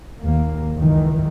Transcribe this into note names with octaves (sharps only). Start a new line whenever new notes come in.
D#2 A#3
C#2 F#2 D#3 E3